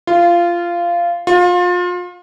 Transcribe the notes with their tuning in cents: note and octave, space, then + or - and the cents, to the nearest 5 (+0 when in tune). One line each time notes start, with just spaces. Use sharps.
F4 -15
F4 +30